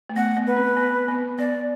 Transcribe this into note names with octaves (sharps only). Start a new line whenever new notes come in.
A3
B3 F#5
B3
B4
C4
B3
B3
B3 D5